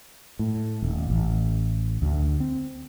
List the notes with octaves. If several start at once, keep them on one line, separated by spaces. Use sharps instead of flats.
A2
D#1
A1
D2
C4